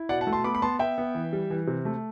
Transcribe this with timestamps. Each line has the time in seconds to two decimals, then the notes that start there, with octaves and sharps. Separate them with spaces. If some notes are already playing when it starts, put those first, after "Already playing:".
Already playing: E4
0.09 B2 D5 F#5
0.21 F#5 A5
0.27 A3
0.33 A5 C6
0.44 B3 B5 D6
0.55 B5
0.62 B3 A5 C6
0.79 B3 E5 G5
0.98 B3
1.15 E3
1.33 G3
1.50 E3
1.67 C3
1.85 A3